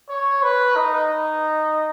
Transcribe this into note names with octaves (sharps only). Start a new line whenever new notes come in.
C#5
B4
D#4